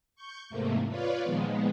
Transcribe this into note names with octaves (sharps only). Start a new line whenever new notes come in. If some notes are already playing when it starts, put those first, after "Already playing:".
C#6 G6
E2 G#2 C3 A3 A#3
F4 B4 C#5 D5 F5
A#2 D#3 F3 G#3 B3